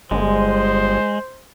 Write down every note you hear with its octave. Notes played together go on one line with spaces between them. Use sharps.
G1 G#3 C5